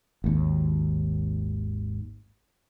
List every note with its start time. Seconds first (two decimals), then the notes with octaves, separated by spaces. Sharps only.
0.24 G#1 D#2